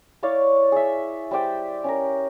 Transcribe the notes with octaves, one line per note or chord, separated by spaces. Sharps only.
E4 C#5 D5 F5
G#4 E5
G3 C5 D5 G5
C#4 G4 A#4